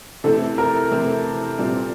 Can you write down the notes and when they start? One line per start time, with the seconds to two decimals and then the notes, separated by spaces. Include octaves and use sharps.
0.24 C3 E3 A3 C4 E4 A4
0.58 A#4
0.91 C3 E3 A3 C4 E4
1.58 A#2 G3 C4